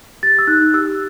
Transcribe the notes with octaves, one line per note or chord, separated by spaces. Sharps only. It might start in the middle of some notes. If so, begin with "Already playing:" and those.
G4 A6
E6
D#4 F#6
G4 E6